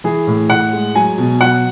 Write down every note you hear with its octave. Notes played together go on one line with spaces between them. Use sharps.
E3 G#4
A2
A2 F#5
G#3
F#3 G#5
B2
F#3 F#5